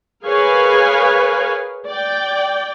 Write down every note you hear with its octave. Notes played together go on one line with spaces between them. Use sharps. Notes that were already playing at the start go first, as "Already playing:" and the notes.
G#4 A#4 B4 C#5 F5 G#5
D5 G5